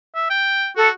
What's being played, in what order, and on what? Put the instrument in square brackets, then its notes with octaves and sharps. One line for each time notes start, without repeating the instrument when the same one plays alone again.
[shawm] E5
G5
[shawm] F#4 [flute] A4